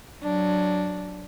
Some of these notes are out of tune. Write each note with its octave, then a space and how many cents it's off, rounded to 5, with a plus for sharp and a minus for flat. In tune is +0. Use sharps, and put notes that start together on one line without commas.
F#3 +0 D4 +0